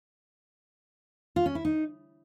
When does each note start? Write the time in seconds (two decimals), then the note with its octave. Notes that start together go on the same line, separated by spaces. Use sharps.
1.36 F4
1.46 C#4
1.55 E4
1.65 D#4